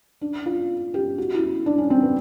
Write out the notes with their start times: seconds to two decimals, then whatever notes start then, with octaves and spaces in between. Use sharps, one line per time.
0.21 D4
0.46 F4
0.94 G4
1.18 F#4
1.34 E4
1.66 D4
1.78 C#4
1.90 C4
2.02 B3